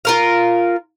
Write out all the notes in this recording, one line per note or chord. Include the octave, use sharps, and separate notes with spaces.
F4 A#4 F5